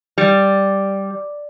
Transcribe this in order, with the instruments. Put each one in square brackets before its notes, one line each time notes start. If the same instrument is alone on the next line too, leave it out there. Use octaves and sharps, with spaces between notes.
[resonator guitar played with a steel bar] G3